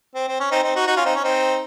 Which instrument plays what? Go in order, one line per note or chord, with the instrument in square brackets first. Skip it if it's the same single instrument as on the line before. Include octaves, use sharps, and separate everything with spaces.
[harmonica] C4
C4
C#4
C4 D#4
C4 D#4
D#4 F#4
D#4 F#4
C#4 F4
C4 D#4
C#4
C4 D#4